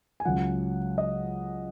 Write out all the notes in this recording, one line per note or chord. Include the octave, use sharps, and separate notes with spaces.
G#5
C#2 C#3 F#3 F#5
D#5